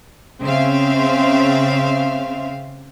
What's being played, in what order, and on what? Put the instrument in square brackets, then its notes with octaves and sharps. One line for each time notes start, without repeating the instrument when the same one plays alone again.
[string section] C#3 C4 E5 F5